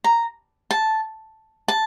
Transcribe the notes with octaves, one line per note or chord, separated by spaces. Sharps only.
A#5
A5
A5